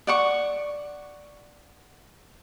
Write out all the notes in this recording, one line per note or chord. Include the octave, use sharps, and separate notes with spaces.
D5 F#5 C#6